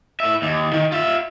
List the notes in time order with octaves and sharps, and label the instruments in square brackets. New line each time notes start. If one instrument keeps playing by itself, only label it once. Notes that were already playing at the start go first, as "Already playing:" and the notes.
[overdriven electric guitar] A2 E5
D#2
D#3
F4 E5